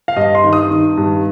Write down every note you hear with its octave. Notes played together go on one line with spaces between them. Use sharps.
F5
G2 D#5
C6
D#3
D#6
D#3
G2